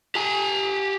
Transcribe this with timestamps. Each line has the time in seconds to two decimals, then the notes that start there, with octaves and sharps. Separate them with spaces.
0.15 G4 G#5